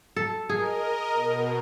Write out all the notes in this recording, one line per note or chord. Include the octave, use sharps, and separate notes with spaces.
A4
G#4 A#4 D#5
B2